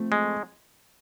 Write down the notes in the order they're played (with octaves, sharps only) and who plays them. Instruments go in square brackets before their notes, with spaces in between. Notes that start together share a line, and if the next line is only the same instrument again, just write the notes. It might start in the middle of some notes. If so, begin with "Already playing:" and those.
Already playing: [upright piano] F3 A3 C4
[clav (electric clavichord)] G#3